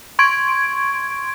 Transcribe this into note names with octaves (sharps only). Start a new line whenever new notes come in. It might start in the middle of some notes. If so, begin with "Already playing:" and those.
C6 C#6 G#6 D7